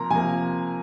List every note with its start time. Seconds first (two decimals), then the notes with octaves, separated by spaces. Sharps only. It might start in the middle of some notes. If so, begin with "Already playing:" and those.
Already playing: C3 F3 A#3 A#5 C6
0.10 C3 F3 A#3 G#5